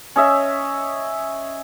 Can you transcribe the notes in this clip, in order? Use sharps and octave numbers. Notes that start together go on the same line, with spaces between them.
C#4 D#5 E5